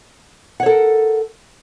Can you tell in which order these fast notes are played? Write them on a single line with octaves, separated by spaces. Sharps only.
F#5 C#5 A4 A#4